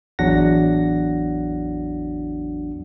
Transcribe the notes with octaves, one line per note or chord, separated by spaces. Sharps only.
A1 E2 F#3 D4 F#5 A#6